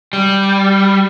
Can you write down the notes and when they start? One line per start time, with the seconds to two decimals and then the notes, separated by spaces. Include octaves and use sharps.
0.13 G3